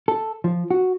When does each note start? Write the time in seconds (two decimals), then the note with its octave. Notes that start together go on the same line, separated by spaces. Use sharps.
0.08 A4
0.44 F3
0.71 F#4